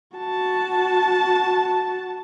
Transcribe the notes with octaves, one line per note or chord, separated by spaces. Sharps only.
F#4 A5